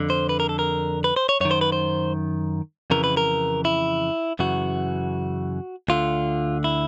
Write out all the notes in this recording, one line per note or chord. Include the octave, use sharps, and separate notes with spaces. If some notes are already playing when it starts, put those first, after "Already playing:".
Already playing: F2 D3
C5
B4
A#4
A4
A#4
B4
C5
C#5
F#2 D#3 C#5
C5
B4
C5
F2 C#3 E3 A#4
B4
A#4
E4
F#2 C#3 E3 F#4
D2 D3 F4
E4